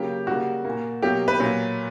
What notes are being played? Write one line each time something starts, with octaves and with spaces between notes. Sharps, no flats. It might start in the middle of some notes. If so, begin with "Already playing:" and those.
Already playing: C#3 F#3 A#3 G4
C#3 G3 A#3 F#4
A#2 A#3
B2 F#3 A#3 G4
B4
A#2 F#3 A#3